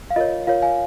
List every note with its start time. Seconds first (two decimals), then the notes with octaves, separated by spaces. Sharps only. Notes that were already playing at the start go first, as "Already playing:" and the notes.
0.10 F5
0.16 F4 A#4 C#5 D#5
0.47 F4 A#4 C#5 F5
0.62 F5 G#5